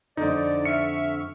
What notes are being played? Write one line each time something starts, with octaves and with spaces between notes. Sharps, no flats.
F2 D3 D#4 D5
E5 C#6 F6 C#7